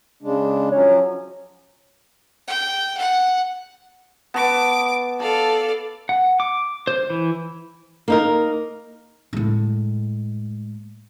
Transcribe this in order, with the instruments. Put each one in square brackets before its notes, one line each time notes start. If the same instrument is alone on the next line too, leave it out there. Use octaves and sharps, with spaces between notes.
[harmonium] C#3 G#3 D4
[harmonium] F3 F#3 C#4 [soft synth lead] C#5
[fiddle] G5
F#5
[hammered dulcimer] B3 A5 [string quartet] D6
[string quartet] A4 D5 F5 [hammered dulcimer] A5
[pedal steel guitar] F#5
D6
C5
E3
[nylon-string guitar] A#3 D#4 A#4
[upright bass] A2 G#3